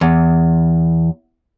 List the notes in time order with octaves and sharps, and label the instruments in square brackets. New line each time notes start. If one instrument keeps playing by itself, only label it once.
[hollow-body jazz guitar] E2